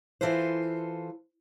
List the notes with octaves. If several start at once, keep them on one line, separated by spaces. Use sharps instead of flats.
E3 F4 A4 B4 C5